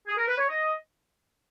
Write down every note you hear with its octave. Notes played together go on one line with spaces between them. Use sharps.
G#4
A#4
B4
C#5
D#5